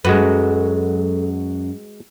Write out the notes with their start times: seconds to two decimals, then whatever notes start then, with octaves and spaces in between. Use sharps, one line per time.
0.05 F#2 G#3 F#4 A4 B4